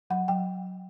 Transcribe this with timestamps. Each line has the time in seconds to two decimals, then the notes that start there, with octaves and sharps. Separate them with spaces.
0.10 F#3 F#5
0.28 F#3 G5